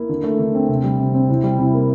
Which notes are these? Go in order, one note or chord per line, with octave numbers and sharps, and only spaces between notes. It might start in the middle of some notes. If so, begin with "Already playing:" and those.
Already playing: A#3 E4
D3
A3
D3
C4
C3
G3
C3
C4
C3 E4
G3
C3 E4
A#3